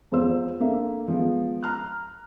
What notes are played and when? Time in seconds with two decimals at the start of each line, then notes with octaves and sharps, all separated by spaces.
0.11 E2 F3 C5 E6
0.60 A#3 D4 A4 E5
1.08 F3 G#3 B3
1.63 A#5 F6 F#6